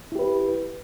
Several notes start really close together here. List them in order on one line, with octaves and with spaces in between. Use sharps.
E4 G4 B4